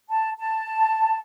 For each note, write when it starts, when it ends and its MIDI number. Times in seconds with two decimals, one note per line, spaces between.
0.09 0.30 81
0.39 1.18 81